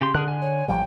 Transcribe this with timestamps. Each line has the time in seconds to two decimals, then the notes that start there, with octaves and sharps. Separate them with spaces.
0.01 C#3 G4 C6
0.15 D3 G#4 A#4 F#6
0.28 G#5
0.42 C#5
0.68 A1 F3 G3 G5